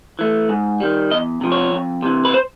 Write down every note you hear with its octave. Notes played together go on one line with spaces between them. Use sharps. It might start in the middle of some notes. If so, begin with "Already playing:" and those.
E3 A3
G#2
D#3 G3
E2 D#5
C3 F3
C#5
F2
C3 E3
B4
C5